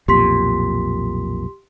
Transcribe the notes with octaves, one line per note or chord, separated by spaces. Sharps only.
B1 F2 A#2 G4 C6 B6